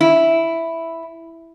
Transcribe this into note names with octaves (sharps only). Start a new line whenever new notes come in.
E4